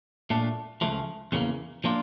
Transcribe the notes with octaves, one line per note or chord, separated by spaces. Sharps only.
A#2 A3 D4
C#2 C#3 F3 A3
E2 C#3 E3 G3 A#3
F3 A#3 D4 F4